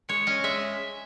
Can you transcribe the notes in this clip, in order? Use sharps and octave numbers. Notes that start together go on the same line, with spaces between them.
G#3 C#5
C#4 D#5
G#3 E5